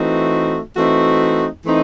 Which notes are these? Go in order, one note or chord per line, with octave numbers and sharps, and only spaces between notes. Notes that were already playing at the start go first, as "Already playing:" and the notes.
Already playing: E3 A3 C4 D#4 F#4
E3 A3 C4 D#4 F#4
E3 A3 C4 D#4